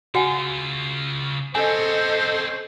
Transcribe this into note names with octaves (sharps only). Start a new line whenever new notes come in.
C#3 F4 F#4 F#5 G#5
C4 C#4 A4 C5 D#5 G#5